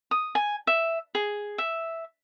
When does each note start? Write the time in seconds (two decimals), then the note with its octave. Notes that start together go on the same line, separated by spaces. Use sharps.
0.11 D#6
0.35 G#5
0.67 E5
1.15 G#4
1.58 E5